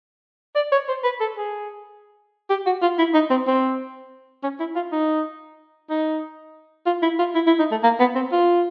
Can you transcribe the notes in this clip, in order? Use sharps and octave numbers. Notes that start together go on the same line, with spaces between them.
D5
C#5
C5
B4
A4
G#4
G4
F#4
F4
E4
D#4
C4
C4
C#4
E4
F4
D#4
D#4
F4
E4
F4
E4
E4
D#4
A3
A#3
B3
C4
F4